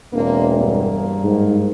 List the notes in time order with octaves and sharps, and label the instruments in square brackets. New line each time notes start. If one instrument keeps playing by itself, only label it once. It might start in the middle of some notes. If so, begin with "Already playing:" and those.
[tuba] E1 [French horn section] A#3 C4 D4
[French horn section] G2 A#3
[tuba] G#2